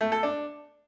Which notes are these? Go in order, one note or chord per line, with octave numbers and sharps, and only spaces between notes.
A3
A4
D4